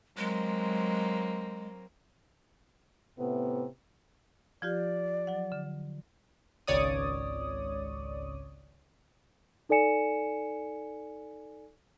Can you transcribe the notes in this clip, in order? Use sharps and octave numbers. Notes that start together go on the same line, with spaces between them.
F#3 G#3 A#3 C4
A2 C3 B3
F3 F4 G4 D5
F#3 F#5
D3
G#1 C#2 C#5 D5 D#6
D#4 A4 D5 G#5 C#7 E7